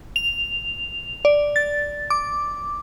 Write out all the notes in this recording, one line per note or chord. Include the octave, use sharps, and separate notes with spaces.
F7
D5
A6
D6